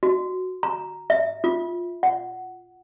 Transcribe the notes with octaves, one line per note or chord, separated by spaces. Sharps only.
F#4
A#5
E5
F4
F#5